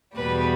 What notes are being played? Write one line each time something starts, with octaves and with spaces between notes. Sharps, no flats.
E2 B2 G3 B4